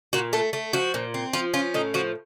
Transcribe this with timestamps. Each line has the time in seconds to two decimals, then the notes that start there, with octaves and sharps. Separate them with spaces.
0.13 A#2 F#4
0.33 A3 A4
0.53 A3
0.73 F3 F#4
0.94 A#2
1.14 C4
1.33 F3 F4
1.54 C#4 F4
1.74 A2 D#4
1.94 F3 F#4